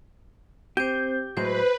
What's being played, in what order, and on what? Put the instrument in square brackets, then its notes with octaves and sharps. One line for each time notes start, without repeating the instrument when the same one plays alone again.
[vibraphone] C4 C5 [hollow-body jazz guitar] G4 [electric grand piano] G6
[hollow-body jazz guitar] A2 F#3 G#3 [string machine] B4 [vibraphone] C5